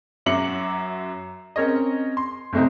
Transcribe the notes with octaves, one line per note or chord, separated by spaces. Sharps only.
F#2 F#3 E5 D6 C#7 F#7
C4 C#4 A#4 C#5 D#5
C6
F#1 C3 A3 C4 D#4